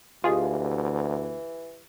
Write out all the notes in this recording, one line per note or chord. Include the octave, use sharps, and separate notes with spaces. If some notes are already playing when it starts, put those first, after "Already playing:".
D2 E3 F4 G4 G#4 D#5 F5